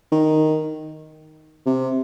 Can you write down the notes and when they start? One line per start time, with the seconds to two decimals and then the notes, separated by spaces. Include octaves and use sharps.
0.12 D#3
1.66 C3